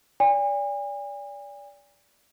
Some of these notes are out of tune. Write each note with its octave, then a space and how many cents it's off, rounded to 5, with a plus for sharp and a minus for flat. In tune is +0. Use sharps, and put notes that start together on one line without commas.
D5 -30 G#5 -40